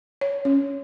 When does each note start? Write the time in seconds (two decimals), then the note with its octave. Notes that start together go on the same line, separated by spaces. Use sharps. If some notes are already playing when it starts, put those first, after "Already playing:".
0.21 C#5
0.45 C#4